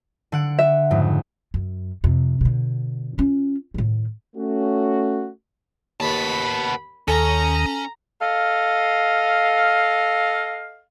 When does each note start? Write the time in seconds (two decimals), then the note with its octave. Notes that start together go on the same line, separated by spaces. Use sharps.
0.32 D3 F#5 D7
0.59 E5
0.91 F2 G#2 C#3
1.54 F#2
2.04 F2 C3
2.41 B2 D3
3.18 C#4 F4
3.74 A2 D#3
4.36 A3 C#4 F#4
6.00 D#2 B3 A5 B5
7.08 D#2 D#3 C#4 A4 A#5
8.22 A4 D#5 F5